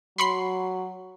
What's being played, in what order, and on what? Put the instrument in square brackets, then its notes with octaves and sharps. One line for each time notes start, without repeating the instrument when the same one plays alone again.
[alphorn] F#3 [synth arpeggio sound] B5 C6 C7